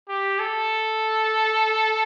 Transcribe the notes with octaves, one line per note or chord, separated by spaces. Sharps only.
G4
A4